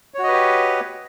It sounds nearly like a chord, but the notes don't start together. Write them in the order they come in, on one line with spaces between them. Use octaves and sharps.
C#5 F#4 D#5 B4 G4